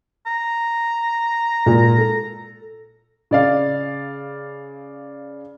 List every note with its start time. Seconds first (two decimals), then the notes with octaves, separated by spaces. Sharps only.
0.27 A#5
1.66 A#2 G#3
1.98 A4
3.31 C#3 D5 F5